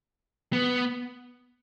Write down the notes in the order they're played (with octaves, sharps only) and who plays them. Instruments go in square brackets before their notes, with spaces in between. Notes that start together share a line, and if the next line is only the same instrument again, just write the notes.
[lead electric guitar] B3